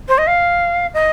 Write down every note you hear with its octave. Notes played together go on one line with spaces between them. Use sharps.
C5
D#5
F5
D#5